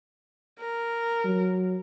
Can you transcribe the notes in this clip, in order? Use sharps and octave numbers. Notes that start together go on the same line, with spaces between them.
A#4
F#3